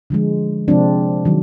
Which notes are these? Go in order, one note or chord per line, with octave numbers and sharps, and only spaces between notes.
D3 F3 G#3
C3 F3 G#3 C4 D4
D#3 F#3